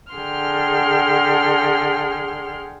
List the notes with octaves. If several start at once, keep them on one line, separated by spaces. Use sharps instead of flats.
D3 G#4 F#5 G5 C6 F6